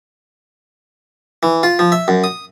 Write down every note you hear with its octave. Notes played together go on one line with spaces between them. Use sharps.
E3
F4
F3
E5
F#2
D#6